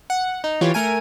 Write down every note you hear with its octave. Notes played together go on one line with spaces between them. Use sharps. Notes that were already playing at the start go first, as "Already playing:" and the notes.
F#5
D#4
E3 F4 G4 C#5
A3 A#4 G#5 D#7